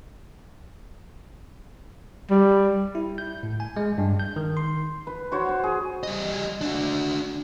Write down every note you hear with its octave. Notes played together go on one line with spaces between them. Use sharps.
G3
E4
G6
A2
G#5
G#3
G2
G6
D#3
C6
B4
F#4 C5 C#5
C5
G#4
G3 D#5
D4 F#4